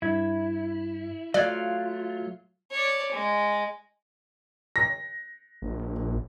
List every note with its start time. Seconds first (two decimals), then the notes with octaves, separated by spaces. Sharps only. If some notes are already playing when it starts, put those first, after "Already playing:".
0.02 G2 E4 G#6
1.34 F#3 A3 F4 D5 F5 F#6 G#6
2.72 C#5 D5
3.12 G#3
4.76 A#6
5.62 A#1